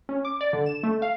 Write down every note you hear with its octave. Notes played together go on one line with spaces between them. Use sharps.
C#4
D6
D5
D3
E7
A3
F5